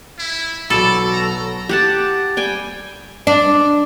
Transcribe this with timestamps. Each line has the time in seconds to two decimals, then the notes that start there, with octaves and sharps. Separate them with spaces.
0.19 E4
0.70 B1 F#3 F#4 A4 D5 B5 F#7
1.13 A#5
1.69 G4 F#5 A5
2.37 G3 G5 G#5
3.27 D4